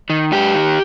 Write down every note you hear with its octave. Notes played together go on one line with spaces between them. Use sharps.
D#3
G#2 G4
D#3